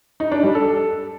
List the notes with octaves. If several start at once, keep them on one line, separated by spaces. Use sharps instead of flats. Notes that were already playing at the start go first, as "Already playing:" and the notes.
D#4
D4
G3
A4